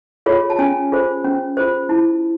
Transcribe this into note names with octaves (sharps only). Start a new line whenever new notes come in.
F4 G#4 C#5
A5
C#4 G#5
F4 G#4 C5
C#4
F4 G#4 C5
E4 A5